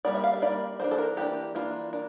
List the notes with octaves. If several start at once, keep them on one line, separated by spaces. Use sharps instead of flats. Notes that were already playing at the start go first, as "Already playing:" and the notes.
G3 A#3 D4 D5
E5
F5
E5
G3 A#3 D4 D5
E3 A#3 D4 C5
A4
A#4
E3 A#3 D4 G4
E3 A#3 D4 F4
A#3 D4